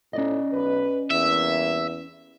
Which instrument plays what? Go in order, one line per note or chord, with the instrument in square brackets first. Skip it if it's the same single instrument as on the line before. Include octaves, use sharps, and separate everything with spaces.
[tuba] A2 [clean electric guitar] C#4 D5 D#5
[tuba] B1 [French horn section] B4
[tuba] E2 [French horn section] C3 G3 A#3 [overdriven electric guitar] E5